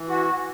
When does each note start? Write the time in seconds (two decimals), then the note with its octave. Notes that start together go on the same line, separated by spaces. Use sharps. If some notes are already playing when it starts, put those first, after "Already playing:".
Already playing: E3
0.09 F#4